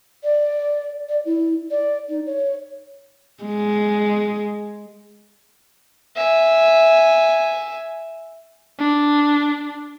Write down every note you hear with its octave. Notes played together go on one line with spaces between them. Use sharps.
D5
D5
E4
D5
D#4
C#5
G#3
E5 G#5
D4